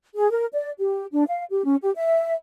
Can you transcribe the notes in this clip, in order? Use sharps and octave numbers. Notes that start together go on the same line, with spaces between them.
G#4
A#4
D5
G4
D4
F5
G4
C#4
G4
E5